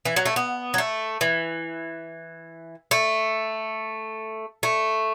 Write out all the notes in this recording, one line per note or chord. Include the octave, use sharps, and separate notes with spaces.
E3
F#3
A3
B3
F#3
A3
E3
A3
A3